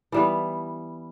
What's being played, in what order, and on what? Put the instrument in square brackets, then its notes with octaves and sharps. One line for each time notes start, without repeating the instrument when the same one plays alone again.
[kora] E3 G3 B3